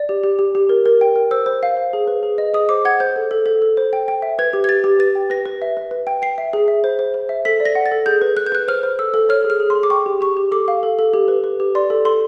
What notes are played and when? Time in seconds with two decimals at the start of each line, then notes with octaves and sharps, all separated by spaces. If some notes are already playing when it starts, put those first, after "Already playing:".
Already playing: D5
0.09 G4
0.24 G4
0.39 G4
0.55 G4
0.69 A#4
0.86 A#4
1.01 G5
1.16 A#4
1.31 C5 E6
1.46 C5
1.63 F5
1.77 C5
1.93 G#4
2.07 B4
2.23 G#4
2.38 D#5
2.54 G#4 D#6
2.69 C5 D6
2.85 F#5 G#6
3.00 C5 G6
3.16 A4
3.31 A4
3.46 A4
3.62 A4
3.77 C5
3.93 G5
4.08 G5
4.22 E5
4.39 B4 G#6
4.53 G4
4.64 G#6
4.69 G4 A6
4.84 G4
4.99 B4 A6
5.15 G5
5.30 B4 A#6
5.46 B4
5.62 E5
5.77 B4
5.91 B4
6.07 G5
6.22 G5 C7
6.38 E5
6.53 G#4
6.68 E5
6.84 C5
6.99 C5
7.14 C5
7.29 E5
7.45 A4 B6
7.60 D5
7.65 A#6
7.75 F#5
7.86 A6
7.92 A4
8.06 G#4 G6
8.22 B4
8.37 B4 F#6
8.46 G6
8.52 B4 F#6
8.68 C5 F6
8.83 C5
8.99 A4 E6
9.14 A4
9.29 C#5 F6
9.44 G#4
9.50 F6
9.60 G#4
9.70 C6
9.75 G#4
9.83 D6
9.90 G5 C#6
10.06 G4
10.21 G4 C#6
10.37 G4
10.51 A4 D6
10.68 F5
10.83 A4
10.99 A4
11.14 G4
11.28 B4
11.44 B4
11.60 G4
11.75 D5 C6
11.90 A4
12.05 A4 C6